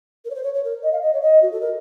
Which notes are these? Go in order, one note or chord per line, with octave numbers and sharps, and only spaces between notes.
A#4
C#5
C5
C#5
C#5
A#4
D#5
F5
D#5
C#5
D#5
F#4
A4
A#4